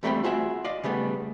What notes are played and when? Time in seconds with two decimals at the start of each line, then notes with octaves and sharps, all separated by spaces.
0.03 E2 G3 A3 C4 G5 B5
0.23 F4 F#4 G#4 E5
0.64 D5 D#5 F5
0.84 C#3 G3 A3 B3